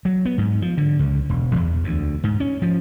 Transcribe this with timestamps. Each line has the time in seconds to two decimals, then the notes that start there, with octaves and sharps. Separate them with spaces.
0.05 F#3
0.25 B3
0.38 G#2
0.62 F3
0.78 D3
0.99 C#2
1.29 E1
1.55 E2
1.84 D2
2.24 G#2
2.40 C#4
2.62 F3